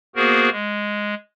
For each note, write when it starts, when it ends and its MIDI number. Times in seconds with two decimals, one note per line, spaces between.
0.16 0.49 58
0.16 0.49 59
0.16 0.49 66
0.16 0.49 68
0.16 0.49 70
0.16 0.49 72
0.52 1.15 56